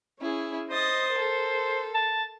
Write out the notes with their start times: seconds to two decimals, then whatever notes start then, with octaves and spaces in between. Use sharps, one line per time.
0.19 C#4 E4 G#4
0.70 C5 D#5 D#6 A6
1.13 A4 A#4
1.95 A5